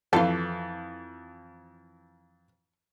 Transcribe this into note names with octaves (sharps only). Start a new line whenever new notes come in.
F2 E3 F4 A4